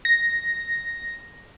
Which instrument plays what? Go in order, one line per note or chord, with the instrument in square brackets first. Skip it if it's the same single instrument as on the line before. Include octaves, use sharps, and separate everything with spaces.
[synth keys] A#6